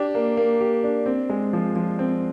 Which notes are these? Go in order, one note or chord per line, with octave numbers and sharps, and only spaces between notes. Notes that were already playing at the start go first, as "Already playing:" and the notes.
Already playing: D4 G4
A#3
A#3
G4
D4
C4
G#3
F3
F3
C4